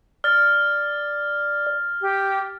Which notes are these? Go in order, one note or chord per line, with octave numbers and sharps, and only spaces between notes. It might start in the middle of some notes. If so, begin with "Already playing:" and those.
D5 F6 A6
G4